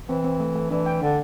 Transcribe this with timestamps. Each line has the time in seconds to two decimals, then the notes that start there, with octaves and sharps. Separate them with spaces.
0.09 E3 C4
0.24 C4
0.40 A3
0.55 A3
0.71 E3 D4
0.86 G5
1.01 D3 D4